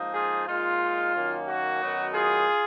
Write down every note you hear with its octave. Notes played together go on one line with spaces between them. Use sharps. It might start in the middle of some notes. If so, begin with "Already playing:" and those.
Already playing: G#2 F3 A#3 D#4
F4 G#4
A#2 G#3 D#4 F4
F#2 D#3 A#3 C#4
F#4
F#2 D#3 F#3 B3 D#4
F4 G#4